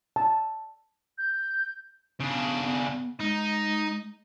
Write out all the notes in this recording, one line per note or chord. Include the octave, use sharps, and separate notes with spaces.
A5
G6
C#3 B3 D4
G#3 D#4